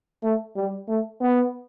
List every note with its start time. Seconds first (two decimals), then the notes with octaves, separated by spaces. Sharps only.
0.23 A3
0.56 G3
0.88 A3
1.21 B3